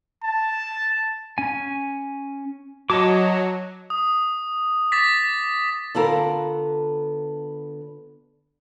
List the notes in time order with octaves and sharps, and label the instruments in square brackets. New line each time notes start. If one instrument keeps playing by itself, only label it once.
[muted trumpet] A5
[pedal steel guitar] C#4 G#5
[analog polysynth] F#3 [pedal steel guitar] D#5 A5 D6
[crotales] D#6
D6 A6 B6
[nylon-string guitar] D3 B3 F4 A4 A#4